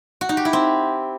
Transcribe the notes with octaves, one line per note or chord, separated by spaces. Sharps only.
F#4
D#4
G4
E4
C4